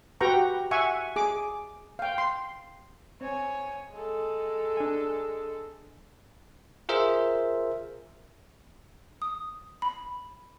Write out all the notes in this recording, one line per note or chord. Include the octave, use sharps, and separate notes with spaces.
F#4 G4 B4 G5 A#5 C#6
E5 F#5 G#5 C#6
G#4 D6
F5 G5
C6
C4 C#5 G#5
G#3 A4
D4 G#5
F4 G#4 A#4 C5 E5
D#6
B5